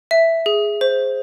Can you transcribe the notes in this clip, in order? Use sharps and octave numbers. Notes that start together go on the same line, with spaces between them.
E5
G#4
C5